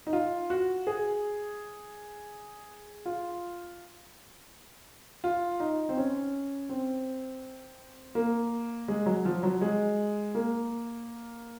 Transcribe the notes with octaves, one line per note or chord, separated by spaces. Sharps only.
D#4
F4
F#4
G#4
F4
F4
D#4
C4
C#4
C4
A#3
G#3
F#3
F3
F#3
G#3
A#3